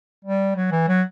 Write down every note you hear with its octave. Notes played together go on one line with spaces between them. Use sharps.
G3
F#3
E3
F#3